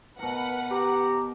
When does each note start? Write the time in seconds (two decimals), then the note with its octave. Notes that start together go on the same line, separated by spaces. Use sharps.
0.19 B2 A#4 B4 F#5
0.71 G4 A#5